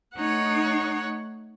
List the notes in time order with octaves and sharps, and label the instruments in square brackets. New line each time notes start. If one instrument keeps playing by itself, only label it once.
[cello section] A3 D#4 [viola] C#5 F#5